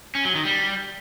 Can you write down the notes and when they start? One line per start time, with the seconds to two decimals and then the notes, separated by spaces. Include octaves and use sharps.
0.15 C#4
0.25 F#3
0.35 D#3
0.45 G3